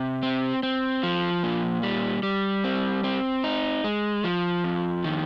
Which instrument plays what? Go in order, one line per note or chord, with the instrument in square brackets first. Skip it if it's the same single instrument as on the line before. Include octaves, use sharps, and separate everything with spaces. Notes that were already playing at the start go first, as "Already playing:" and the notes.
Already playing: [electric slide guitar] C3
C4
C4
F3
A#2
G3
G3
C4
C4
D#4
G#3
F3
F2
D#3